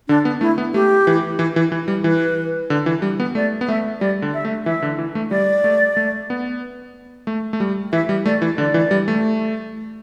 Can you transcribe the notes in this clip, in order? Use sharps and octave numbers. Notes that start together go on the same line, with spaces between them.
D3 D4
B3
A3 E4
B3
A3 G4
E3
E3
E3
E3
G3
E3 B4
D3
E3
G3
B3
A3 D5
B3
A3 E5
G3 D5
D3
E5
A3
E3 E5
D3
E3
A3
G3 D5
A3
A3
B3
A3
A3
G3
E3 E5
G3
A3 D5
E3
D3 D5
E3
G3
A3